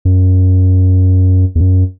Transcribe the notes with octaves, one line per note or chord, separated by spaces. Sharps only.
F#2
E2
F#2